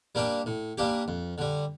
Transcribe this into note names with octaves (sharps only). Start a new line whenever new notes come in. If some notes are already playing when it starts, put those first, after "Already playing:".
G3 A#3 D4 G4
A2
G3 A#3 D4 G4
F2
D3 G3